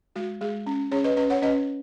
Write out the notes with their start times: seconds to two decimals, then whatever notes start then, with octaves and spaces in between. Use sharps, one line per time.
0.16 G#3 F#4
0.41 G#3 G#4
0.66 C#4
0.92 C#4 G#4 C#5
1.04 B4 D#5
1.16 C#4 B4 D#5
1.30 C#5 F#5
1.42 C#4 B4 D#5